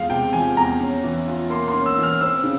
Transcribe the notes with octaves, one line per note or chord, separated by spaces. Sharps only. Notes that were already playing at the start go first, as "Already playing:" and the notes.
Already playing: E2 F3 G#3 F5
C3 G5
F3 G#5
E2 A#5
C#4
E3
F4
A#3 C6
C6
C#4
E6
E3
F6
C4 E6
C#3